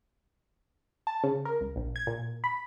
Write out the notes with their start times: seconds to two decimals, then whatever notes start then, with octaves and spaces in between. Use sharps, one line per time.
1.07 A5
1.24 C#3
1.45 A#4
1.61 C#2
1.76 A#1
1.96 G#6
2.07 A#2
2.44 B5